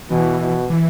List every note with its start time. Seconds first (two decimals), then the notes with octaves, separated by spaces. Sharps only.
0.11 B2 E3
0.40 B2
0.70 E3